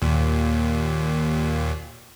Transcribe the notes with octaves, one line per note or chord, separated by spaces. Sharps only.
D#2 A#2